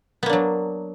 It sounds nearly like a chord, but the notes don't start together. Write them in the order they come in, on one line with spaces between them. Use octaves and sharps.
B3 A#3 D4 F#3